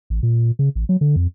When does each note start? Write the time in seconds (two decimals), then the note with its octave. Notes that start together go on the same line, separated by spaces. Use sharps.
0.10 A1
0.23 A#2
0.59 C#3
0.76 A1
0.89 F#3
1.01 D3
1.16 F2